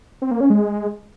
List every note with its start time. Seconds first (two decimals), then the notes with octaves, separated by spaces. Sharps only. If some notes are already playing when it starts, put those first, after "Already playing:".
0.22 C4
0.31 A#3
0.41 C#4
0.50 G#3